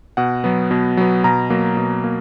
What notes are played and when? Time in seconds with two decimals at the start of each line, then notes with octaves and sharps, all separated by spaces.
0.17 B2 F#5
0.44 F#3 B3
0.71 B2
0.97 F#3 B3
1.24 B2 A#5
1.50 F#3 A#3
1.77 B2
2.04 A#3